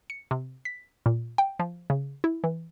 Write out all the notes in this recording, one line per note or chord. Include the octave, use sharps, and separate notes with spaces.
C#7
C3
B6
A#2
G5
F3
C#3
E4
E3